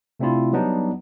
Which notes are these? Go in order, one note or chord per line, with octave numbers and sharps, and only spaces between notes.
C3 A3 C4 D4 E4 F4
F#3 G3 B3 D4 D#4